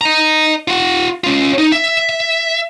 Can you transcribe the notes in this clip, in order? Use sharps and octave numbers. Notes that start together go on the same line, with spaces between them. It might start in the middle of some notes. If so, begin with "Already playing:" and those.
D#5 A#5
F4 F#5
C#4 F4
D#4
E5